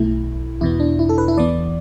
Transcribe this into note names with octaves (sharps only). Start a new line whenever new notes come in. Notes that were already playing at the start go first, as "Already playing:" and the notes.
Already playing: B1 B2 A3 E4
E2 B2 B3 E4
D4
E4
A4
B4
E4
E2 E3 B3 D5